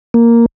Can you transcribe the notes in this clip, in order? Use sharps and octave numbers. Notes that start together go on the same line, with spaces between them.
A#3